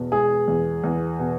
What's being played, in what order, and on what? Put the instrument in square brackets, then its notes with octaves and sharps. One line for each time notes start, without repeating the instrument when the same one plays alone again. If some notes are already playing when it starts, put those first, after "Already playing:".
Already playing: [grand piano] E2 B2
G#3 G#4
E2
E2
B2